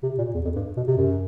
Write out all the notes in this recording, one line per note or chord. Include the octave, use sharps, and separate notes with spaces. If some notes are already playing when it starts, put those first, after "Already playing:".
C3
A#2
E2
F2
G2
B2
C3
F#2